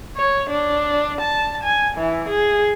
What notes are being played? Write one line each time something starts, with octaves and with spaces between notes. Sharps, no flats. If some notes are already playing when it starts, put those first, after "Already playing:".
C#5
D4
A5
G#5
E3
G#4